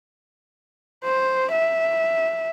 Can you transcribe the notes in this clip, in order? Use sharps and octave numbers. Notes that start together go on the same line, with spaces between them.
C5
E5